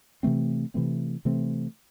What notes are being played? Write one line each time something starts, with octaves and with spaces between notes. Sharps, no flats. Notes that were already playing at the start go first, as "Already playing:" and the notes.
C3 E3 A3 C4
C3 E3 A3 C4
C3 E3 A3 C4